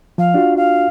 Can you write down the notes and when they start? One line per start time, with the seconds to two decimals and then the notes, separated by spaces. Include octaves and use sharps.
0.18 F3 F5
0.34 D4 F4 F#4
0.56 F5